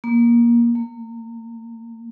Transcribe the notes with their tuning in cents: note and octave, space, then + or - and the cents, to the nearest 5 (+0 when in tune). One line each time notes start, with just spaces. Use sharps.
A#3 +20
A#3 -30